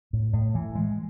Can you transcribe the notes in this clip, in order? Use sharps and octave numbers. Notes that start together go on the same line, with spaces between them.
A2
A2
E3
G#3